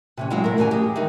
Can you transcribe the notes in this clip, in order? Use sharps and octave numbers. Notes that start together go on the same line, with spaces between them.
C3 E3 C#4
F#3 G#3 E4 F4 G#4
A3 A#4
D#2 C#3 E3 G3 G#5
G4 G#4
D#3 E3 G#3 D#4